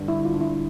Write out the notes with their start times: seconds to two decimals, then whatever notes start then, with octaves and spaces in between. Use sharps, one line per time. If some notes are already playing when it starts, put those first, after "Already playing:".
Already playing: G2 D3 G3
0.08 E4
0.25 F4
0.34 D4
0.41 E4